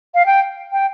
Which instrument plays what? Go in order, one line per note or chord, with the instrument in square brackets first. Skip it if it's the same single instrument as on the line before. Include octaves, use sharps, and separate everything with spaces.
[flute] F5
G5
G5